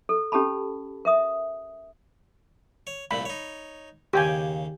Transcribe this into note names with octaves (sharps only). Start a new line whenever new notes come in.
A4
C#4 G4 A4 A5 B5
A#4 E5 D#6
C#5
C2 A#2 A3 B5
D#4 C#5
D#2 C#3 G4 G5 G#5